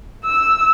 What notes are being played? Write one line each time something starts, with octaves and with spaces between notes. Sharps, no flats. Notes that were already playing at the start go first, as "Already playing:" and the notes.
E6